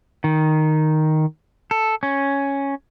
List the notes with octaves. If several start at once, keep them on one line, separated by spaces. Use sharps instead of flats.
D#3
A4
C#4